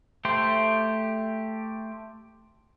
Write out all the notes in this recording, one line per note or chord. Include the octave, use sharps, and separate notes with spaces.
A3 G4 C5